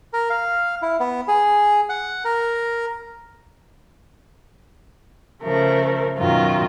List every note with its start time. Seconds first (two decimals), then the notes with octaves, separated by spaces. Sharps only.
0.13 A#4
0.30 F5
0.82 E4
1.00 B3
1.28 G#4
1.89 F#5
2.25 A#4
5.42 C#3 F3 A3 A#4
6.18 F#2 B2 D#3 F#3 F4